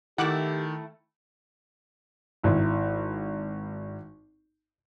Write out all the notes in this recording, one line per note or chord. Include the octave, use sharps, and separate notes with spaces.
D#3 A3 E4 G4 F#5 D6 F#6
G#1 E4